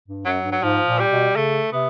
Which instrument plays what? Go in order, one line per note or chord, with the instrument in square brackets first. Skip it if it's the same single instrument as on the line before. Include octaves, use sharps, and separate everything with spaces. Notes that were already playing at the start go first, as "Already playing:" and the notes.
[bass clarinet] G2
[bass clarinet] F#2 [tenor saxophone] F#3
[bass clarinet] G2
[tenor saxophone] F#3
[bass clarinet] G#2 [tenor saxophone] F3
[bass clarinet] A#2
[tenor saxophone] G3
[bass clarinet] B2
[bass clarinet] C#3 [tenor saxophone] A3
[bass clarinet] C3 [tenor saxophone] B3